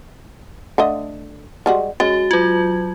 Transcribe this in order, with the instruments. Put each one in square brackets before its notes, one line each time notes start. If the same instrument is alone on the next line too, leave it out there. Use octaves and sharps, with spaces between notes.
[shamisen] D3 A3 D#5
G3 G#3 F#4
[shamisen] G#3 C#4 [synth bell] F#4
[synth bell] F#3 F4